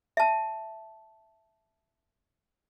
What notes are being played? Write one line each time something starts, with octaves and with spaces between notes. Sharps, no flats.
E5 A5